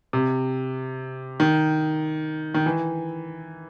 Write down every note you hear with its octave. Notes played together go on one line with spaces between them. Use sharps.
C3
D#3
D#3
E3